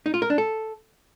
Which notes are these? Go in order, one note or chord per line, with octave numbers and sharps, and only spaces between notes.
D#4
F4
A#4
D4
A4